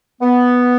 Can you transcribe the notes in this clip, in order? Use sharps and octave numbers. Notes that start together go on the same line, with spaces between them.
B3